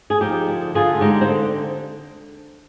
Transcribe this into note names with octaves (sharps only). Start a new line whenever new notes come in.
G#4
F3 D#4 G4
D3
D3 F4 G#4
F4
G#3 D#4 G4
C4
D3